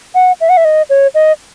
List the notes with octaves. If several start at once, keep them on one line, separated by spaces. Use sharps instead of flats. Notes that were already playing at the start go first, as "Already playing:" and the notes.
F#5
E5
F#5
E5
D#5
C#5
D#5